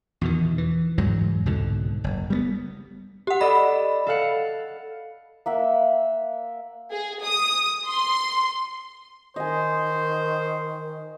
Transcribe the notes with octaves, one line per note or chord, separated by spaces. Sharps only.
E2 B2 D#3
E3
E2 G#2 C#3 F#3
C2 G#2 B2 D3
F#1
G3 A3 B3
G4 F#5
A4 D5 D#5 B5
A4 F5 F#5
A#3 E5 F#5
G#4
D#6
C6
D#3 C5 D#5 G#5